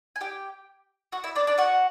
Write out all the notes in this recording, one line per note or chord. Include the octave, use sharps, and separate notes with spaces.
G#5
G4 G5
F#4 F#5
E4 E5
D4 D5
D4 D5
F#4 F#5